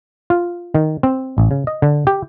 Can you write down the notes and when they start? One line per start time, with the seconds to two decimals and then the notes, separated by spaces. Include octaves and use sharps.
0.30 F4
0.75 D#3
1.03 C4
1.38 A1
1.51 C#3
1.67 D#5
1.82 D3
2.07 G4